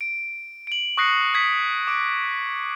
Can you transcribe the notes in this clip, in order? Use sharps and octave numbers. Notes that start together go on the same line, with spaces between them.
D7
D7 F#7
C#6 D#6 F#6 A#6 C7 C#7
D#6 G#6 B6
D6 D7